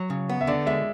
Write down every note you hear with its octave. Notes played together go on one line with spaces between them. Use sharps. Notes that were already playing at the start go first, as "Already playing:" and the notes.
Already playing: F#3
C#3
B3
E5
D3 D5
G#3 E5